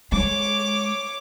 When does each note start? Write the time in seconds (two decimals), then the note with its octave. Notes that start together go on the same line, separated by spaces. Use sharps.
0.12 G#3 C#5 D6